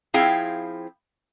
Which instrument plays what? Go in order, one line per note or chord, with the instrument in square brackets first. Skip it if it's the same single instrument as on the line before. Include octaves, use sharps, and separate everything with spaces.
[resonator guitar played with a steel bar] F3 C4 E4 G#4 F5 G5